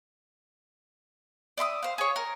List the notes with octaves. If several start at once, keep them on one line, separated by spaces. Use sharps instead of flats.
D5 E5 C6 D#6
C5 F5
G#4 C#5
A#4